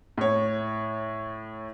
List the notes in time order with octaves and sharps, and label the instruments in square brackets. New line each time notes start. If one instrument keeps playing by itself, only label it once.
[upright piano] A2 C#5